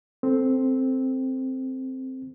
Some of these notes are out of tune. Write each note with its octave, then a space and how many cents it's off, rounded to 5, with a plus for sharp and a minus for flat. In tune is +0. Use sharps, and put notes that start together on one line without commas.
C4 +0 A4 +0